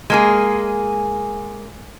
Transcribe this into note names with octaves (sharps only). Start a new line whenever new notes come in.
G#3 A#3 G#4